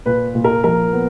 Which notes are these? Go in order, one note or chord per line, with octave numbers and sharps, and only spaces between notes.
A#2 B4
A#2
A#4
F3 A#4
B3